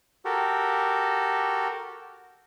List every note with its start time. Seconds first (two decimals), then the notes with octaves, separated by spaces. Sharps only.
0.25 F#4 G4 A4 A#4